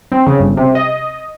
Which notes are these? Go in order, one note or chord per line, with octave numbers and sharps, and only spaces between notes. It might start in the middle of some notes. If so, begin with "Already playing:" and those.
C4
C#3
G1
C3
D#5